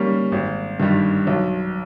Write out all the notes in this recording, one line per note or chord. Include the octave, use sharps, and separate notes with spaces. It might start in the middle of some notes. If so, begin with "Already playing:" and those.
Already playing: G3 A#3 C#4
G#1
G2 D#3 G3
B1